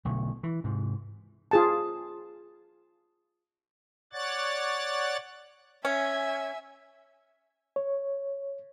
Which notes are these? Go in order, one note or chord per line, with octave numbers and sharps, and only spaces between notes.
B1 B2 D3 A3
E3
G#2 C3
F4 G#4 A5
C#5 D5 F#5 F#6 A6
C#4 E5 G#5
C#5